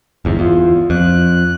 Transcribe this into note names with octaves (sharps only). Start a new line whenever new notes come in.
G1 E2 G#2
E2 F4
F2 F#6